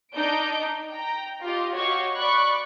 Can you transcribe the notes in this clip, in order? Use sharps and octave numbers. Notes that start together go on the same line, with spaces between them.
D4 D#4 G6 D7
G5 A#5
F4 G4 D#5
F#4 G4 C#5 D#5 F5 C#6
D5 B5 C#6 F#6